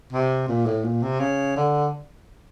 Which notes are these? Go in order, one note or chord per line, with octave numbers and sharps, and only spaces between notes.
C3
A#2
A2
A#2
C3
C#3
D3